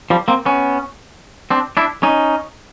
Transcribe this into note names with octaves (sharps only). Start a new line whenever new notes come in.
F3 G3
A#3 C4
B3 C#4
C4 D4
D4 E4
C#4 D#4